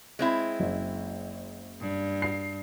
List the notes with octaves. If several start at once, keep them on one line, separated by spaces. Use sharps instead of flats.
G#3 C4 E4
F#1
G2
C7